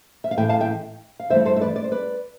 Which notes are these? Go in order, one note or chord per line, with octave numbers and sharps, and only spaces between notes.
E5
F5
A2 E3 A3 E5 G5
F5 A5
E5 G5
F5
G2 E3 A3 C5 E5
A4 C5
E5
B4 D5
D5
C5
B4 D5